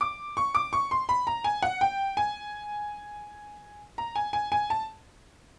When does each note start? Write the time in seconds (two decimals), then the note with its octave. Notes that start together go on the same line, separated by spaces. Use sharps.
0.01 D6
0.37 C#6
0.55 D6
0.73 C#6
0.91 C6
1.09 B5
1.27 A#5
1.44 G#5
1.63 F#5
1.81 G5
2.17 G#5
3.98 A#5
4.16 G#5
4.33 G#5
4.52 G#5
4.70 A5